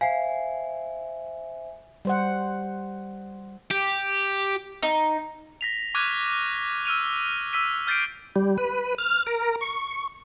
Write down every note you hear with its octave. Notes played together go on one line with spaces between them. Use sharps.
C5 E5 F5 G#5 C7
G3 C5 F#5
G4
D#4
A#6 B6 F7
C#6 D6 F6 F#6 G#6 D#7
E6 F6 D#7 F7
E6 B6 D#7
F6 G6 A6 B6 C7 D7
G3
B4
F6
A#4
C#6